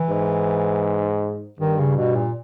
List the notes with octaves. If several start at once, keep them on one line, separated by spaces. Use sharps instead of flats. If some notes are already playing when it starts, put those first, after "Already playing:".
Already playing: E3
G#2
G2 D#3
C#3
B2
A#2